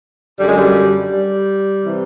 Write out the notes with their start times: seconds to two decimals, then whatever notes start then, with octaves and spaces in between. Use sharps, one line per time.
0.39 F#2 D3 G3
0.48 G#3
0.57 G3
1.10 G3
1.84 C3 E3